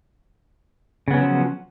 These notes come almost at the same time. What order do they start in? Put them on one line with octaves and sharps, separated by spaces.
C#3 B3 C#4 F#3 F3